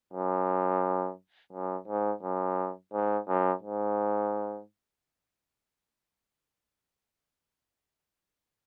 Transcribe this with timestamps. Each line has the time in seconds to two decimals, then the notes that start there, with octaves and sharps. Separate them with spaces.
0.13 F#2
1.52 F#2
1.88 G#2
2.23 F#2
2.93 G#2
3.28 F#2
3.63 G#2